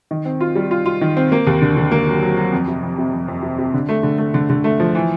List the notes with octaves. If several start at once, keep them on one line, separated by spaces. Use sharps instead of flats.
D#3
C4
F4
G3
F4
F4
D#3
C4
A#3
D#2
D3
D3
A#3
F#3
F#3
F#3
F2
C3
F2
C3
F2
F2
C3
C3
D3
A3
D3
A3
D3
D3
A3
F3
E3